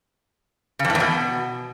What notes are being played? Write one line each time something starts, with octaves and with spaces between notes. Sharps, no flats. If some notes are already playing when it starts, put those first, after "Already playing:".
C#3
F2
A2
E2
B2